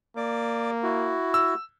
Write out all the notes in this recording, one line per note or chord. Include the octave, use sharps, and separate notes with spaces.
A#3 D5 D6
E4 F#4
E6